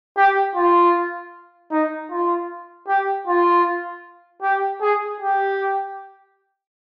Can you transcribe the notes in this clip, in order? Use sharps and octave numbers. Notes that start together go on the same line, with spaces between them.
G4
F4
D#4
F4
G4
F4
G4
G#4
G4